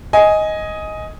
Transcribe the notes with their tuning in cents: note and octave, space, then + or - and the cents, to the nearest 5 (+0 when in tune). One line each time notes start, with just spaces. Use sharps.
D#5 +10 G#5 +0